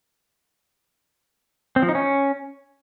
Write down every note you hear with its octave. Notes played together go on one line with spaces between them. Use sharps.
C4
F3
D#4
C#4